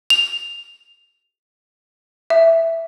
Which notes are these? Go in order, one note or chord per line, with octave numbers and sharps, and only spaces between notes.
F7
E5